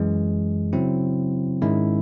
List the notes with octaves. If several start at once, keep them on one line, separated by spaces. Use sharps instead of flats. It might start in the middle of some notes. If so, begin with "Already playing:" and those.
Already playing: F#2 E3 G#3
C#3 F#3 C4 E4
G#2 D#3 G#3 C#4 E4